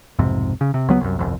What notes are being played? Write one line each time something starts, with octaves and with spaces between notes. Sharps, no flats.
B1 F2 G#2 C3
C#3
C3
C#2 F#3 B3
C2 F#2
G1 C2 F2